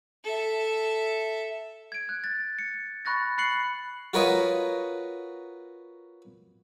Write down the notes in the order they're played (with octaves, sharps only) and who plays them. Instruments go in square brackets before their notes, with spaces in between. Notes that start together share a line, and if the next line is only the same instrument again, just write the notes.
[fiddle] A4 E5
[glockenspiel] G#6 D7
F#6
A6
C#7
B5 C#6 F#6 A6 A#6
B5 F#6 C7 C#7 F#7
[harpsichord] F4 F#4 A#4 B4 C#5 D#5